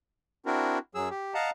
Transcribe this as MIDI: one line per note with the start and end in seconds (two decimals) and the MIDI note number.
0.46 0.78 60
0.46 0.78 62
0.46 0.78 64
0.46 0.78 66
0.46 0.78 70
0.95 1.09 42
0.95 1.09 54
0.95 1.09 68
0.95 1.09 88
1.10 1.34 67
1.34 1.50 75
1.34 1.50 77
1.34 1.50 78
1.34 1.50 81
1.34 1.50 82